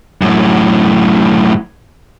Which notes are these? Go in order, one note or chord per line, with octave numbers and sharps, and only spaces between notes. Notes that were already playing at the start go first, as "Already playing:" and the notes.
F#2 A2